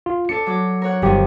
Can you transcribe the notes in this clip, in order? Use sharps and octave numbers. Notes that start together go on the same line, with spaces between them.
F4
D4 A4 D5 C#7
F#3 D6
A#4 C#5 F#5
G1 D#3 F3 G3 G4